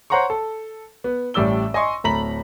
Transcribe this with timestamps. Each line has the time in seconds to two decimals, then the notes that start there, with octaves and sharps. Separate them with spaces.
0.10 C5 C#5 F#5 A#5 C6 C#6
0.30 A4
1.04 B3
1.34 A1 A2 G3 D5 E6 G7
1.74 D#5 G#5 C6 C#6
2.04 D1 A3 A#5 B5 B6 F#7